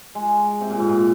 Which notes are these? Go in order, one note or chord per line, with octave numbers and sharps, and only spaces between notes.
G#3
C3
A#2
G#2
A#2